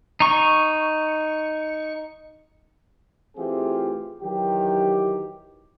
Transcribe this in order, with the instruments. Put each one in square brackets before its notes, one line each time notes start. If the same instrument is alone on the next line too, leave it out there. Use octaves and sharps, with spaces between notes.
[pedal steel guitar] D#4 C#6
[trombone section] E3 A3 C4 F4 G4 G#4
D#3 E3 F#3 G4